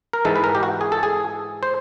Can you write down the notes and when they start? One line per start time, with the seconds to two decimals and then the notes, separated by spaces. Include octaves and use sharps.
0.13 A#4
0.25 G#2 E3 G#3 A4
0.36 B4
0.44 A#4
0.55 G4
0.63 F#4
0.81 G#4
0.92 A4
1.03 G#4
1.63 C5